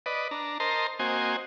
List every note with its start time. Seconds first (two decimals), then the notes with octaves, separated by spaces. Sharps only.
0.06 B4 D5 D#5
0.31 D4 A#5
0.60 A#4 C5 D#5 A5 A#5 C6
0.99 A#3 C4 F#4 C5 D#5 G#5